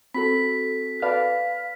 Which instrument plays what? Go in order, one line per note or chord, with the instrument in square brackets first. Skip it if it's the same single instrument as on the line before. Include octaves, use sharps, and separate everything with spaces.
[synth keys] C4 F#4 A4 [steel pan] B5 [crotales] B6
[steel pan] B4 D5 A5 [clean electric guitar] F5